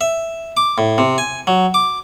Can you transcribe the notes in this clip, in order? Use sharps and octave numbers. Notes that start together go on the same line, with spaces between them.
E5
D6
A2
C3
G#5
F#3
D6